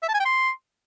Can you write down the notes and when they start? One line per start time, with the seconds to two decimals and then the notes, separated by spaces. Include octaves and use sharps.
0.03 E5
0.08 A5
0.14 G#5
0.20 G5
0.25 C6